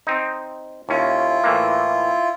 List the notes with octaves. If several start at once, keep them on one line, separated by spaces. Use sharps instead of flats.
C4 D#4
D#2 C#4 E4 F4
A2 E3 A#3